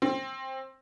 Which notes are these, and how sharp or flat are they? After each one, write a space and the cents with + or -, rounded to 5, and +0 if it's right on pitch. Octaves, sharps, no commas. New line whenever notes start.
C4 +15